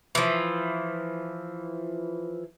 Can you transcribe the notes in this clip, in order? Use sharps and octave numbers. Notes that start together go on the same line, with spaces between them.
E3 F3